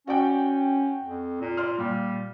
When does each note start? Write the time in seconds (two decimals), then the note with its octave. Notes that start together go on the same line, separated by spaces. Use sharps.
0.07 C#4 F#4 D5 G5
1.04 F2
1.41 A#2
1.57 D5 C6 F6
1.78 A#2 G3